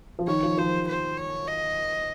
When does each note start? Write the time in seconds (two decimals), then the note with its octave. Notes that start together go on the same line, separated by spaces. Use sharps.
0.19 F3
0.28 D#3 C#5
0.43 F3
0.58 F3 C5
0.88 C5
1.18 C#5
1.48 D#5